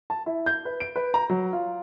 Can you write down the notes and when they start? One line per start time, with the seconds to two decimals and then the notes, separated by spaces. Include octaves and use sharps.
0.10 A5
0.26 E4
0.46 G6
0.65 B4
0.80 D7
0.96 B4
1.14 A#5
1.30 F#3
1.53 F4